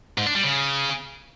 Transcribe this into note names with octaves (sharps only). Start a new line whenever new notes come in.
G#2
D4
G3
C#3